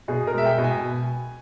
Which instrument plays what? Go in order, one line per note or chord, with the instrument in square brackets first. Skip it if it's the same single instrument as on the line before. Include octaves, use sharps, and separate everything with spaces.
[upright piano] B2 G#4
A#4
G#3 E5
G5
B2
G#5